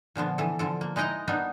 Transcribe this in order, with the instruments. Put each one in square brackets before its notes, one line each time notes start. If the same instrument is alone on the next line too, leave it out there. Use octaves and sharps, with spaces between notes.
[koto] A#2 D3 F3 B3
E3 A4
D3 F3 A4
A#3
G#3 D#4 E4 D#5 G5 A#5
G3 A#3 B3 D4 D#4